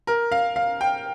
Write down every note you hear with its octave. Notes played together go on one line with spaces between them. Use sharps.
A#4
F5
F5
G5